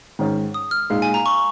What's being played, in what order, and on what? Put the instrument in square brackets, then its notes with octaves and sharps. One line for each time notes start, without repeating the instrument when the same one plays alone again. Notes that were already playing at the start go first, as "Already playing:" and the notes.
[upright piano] G#2 D#3 C#4
[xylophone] D#6
F6
[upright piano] A#2 G#3 D#4 [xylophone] F5
[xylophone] G#5
A#5
C#6